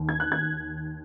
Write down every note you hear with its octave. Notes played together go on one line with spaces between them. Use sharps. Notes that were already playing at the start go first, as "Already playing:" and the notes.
Already playing: D#2
G#6
F#6
G#6